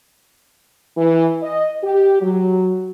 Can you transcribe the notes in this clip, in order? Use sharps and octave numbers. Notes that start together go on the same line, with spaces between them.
E3
D#5
G4
F#3